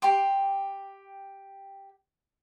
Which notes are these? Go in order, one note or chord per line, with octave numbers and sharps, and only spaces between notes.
G4 G5 C6 D6